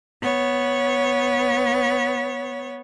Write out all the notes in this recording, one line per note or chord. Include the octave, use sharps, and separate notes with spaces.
B3 C#5